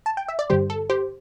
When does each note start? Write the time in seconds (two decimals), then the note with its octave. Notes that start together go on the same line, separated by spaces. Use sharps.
0.06 A5
0.17 G5
0.28 E5
0.39 D5
0.50 G2 D3 G3 G4 C5
0.70 A4
0.90 G4 C5